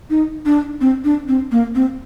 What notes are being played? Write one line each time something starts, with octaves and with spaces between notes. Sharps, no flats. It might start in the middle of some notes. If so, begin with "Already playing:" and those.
D#4
D4
C4
D4
C4
A#3
C4